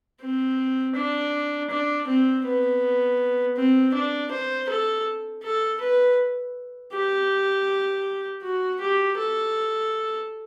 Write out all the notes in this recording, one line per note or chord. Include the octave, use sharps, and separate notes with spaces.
C4
D4
D4
C4
B3
C4
D4
C5
A4
A4
B4
G4
F#4
G4
A4